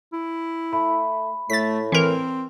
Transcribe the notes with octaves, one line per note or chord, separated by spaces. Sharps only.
E4
A3 B5
A2 A3 A6 B6
E3 C4 A#4